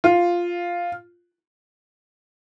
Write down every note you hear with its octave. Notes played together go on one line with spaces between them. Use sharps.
F4